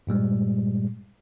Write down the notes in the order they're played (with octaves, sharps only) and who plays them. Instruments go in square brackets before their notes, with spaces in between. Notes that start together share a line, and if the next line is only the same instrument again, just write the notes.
[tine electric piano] G2 A#2 G3 G#3